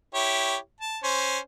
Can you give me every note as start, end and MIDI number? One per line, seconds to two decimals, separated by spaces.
0.15 0.56 64
0.15 0.56 67
0.15 0.56 73
0.81 0.99 81
1.04 1.38 61
1.04 1.38 72